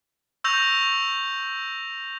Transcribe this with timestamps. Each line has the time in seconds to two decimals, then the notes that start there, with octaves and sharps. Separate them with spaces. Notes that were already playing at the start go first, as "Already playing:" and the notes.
0.44 C#6 E6 G6 A#6 F7